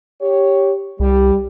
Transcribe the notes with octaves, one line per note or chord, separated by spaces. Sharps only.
G4 C#5
C2 G3